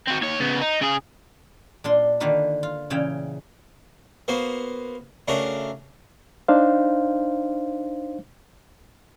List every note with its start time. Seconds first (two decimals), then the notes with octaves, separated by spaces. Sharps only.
0.07 C4 F#4
0.21 D#2 C#5
0.40 C#3 B3
0.62 D#4
0.81 C#3 G#4
1.84 A#2 D4 C6
2.20 D3 D#3 A#3 F4 B4 C5
2.63 F4
2.90 A#2 C#3 E3 G5
4.28 A#3 B3 F#4 C5
5.28 C#3 A3 D4 F#4 A#4
6.48 D4 D#4 C5 F5